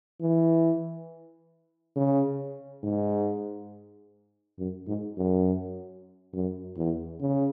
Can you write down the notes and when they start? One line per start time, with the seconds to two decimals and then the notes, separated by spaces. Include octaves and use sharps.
0.21 E3
1.96 C#3
2.84 G#2
4.59 F#2
4.87 G#2
5.17 F#2
6.33 F#2
6.77 E2
7.21 C#3